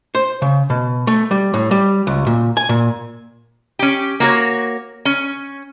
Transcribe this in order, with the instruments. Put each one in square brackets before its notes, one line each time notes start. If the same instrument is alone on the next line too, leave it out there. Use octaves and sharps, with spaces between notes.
[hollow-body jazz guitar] C5
C#3
B2
A3
G3
A2
G3
C#2
A#2
G#5
A#2
[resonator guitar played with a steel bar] C#4 G4
A#3 F#4 C#5
C#4